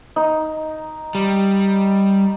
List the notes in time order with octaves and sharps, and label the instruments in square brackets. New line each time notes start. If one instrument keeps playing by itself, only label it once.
[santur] D#4
[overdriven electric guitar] G3